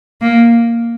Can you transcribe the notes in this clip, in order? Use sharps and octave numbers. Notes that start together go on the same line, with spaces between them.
A#3